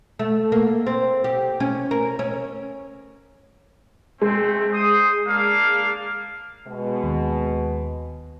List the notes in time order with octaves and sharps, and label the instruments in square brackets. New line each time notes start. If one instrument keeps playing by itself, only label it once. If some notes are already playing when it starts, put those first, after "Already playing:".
[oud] A3
A#3
C4
G4
C#4
A#4
C#4
[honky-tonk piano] G#3 [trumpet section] A3 C4
[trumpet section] C5 D#6
A#3 D4 F5
[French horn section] B2 G#3
[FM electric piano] D#2